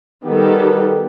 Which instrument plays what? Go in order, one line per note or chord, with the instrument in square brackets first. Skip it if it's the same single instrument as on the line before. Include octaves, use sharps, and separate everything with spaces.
[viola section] D#3 G3 A4 [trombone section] B3 F#4 G4